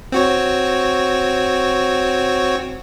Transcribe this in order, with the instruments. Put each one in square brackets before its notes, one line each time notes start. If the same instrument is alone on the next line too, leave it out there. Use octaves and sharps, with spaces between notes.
[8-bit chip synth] C4 F#4 C#5